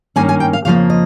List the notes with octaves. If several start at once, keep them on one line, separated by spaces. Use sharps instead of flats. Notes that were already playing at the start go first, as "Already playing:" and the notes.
G2 D#3 A#3 C#4 G#5
G#5
G5
F5
F2 C#3 F3 A#3 F5
D#5